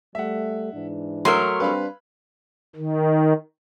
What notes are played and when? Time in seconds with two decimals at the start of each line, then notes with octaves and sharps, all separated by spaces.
0.15 G3 A3 E5 F#5
0.73 G#2 E3 D4
1.25 F#3 A3 A#4 C#5 F#5 C6 D#6
1.60 G3 C4 D4 B4 F5 B5
2.76 D#3